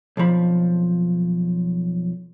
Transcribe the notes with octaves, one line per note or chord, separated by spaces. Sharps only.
B1 F2 F3 B5